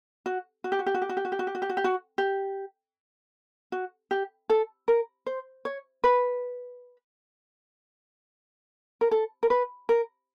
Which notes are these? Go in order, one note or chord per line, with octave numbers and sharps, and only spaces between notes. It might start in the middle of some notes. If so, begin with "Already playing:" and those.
F#4
F#4
G4
F#4
G4
F#4
G4
F#4
G4
F#4
G4
F#4
G4
F#4
G4
F#4
G4
F#4
G4
F#4
G4
A4
A#4
C5
C#5
B4
A#4
A4
A#4
B4
A#4